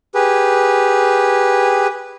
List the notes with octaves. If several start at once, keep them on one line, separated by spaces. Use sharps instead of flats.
G4 G#4 B4